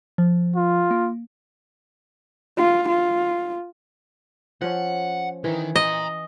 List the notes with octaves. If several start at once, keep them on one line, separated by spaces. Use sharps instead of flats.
F3
F4
A#3
F4
F4
F3 C#4 F#5
D#3 E3
D#5 A#5 C6